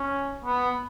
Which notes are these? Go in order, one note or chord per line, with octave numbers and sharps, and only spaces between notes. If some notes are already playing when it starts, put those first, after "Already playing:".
Already playing: C#4
B3